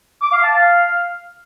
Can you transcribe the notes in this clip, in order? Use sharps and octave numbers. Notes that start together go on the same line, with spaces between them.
D6
F5
A5
F5